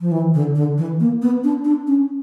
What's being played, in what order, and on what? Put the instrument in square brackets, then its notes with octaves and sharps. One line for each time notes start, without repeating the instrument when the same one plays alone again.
[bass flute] F3
E3
D3
D3
E3
A#3
B3
D4
D4
C#4